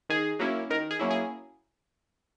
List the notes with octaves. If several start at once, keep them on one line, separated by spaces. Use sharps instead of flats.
D#3 G#4
F#3 A#3 C#4 E4
D#3 A#4
G#4
F#3 A#3 C#4 E4
G#4